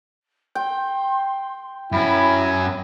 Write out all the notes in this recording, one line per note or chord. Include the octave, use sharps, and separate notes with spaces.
G5 C6
F#2 C#4 E4 B5